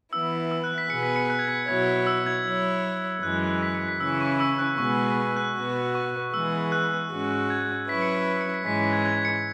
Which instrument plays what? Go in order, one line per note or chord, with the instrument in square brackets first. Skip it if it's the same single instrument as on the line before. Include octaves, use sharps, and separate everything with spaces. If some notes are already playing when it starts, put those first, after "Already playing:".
[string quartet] E3 B3 E4 [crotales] E6
[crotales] E6
F#6
B6
[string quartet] B2 B3 G#4 B4 [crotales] C#7
[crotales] B6
C#7
F#6
G#6
B6
[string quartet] B2 F#3 E4 C#5 [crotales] G#6
[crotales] E6
G#6
[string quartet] F#3 E4 C#5
[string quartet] F#2 E3 G#3 [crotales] F#6
[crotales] B6
C#7
B6
[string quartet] C#3 E3 C#4 E4 [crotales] E6
[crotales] C#6
E6
F#6
[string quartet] B2 G#3 B3 G#4 B4 [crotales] C#6
[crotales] F#6
[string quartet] B2 B3 F#4
[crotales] C#6
[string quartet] E3 G#3 B3 G#4 [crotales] E6
[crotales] F#6
[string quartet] G#2 G#3 C#4 F#4
[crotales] G#6
[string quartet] F#3 C#4 E4 B4 [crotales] B6
[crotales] C#7
B6
B6
C#7
B6
[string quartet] G#2 E3 G#3 C#4 [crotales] B6
[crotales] B6
G#6
G#6
C#7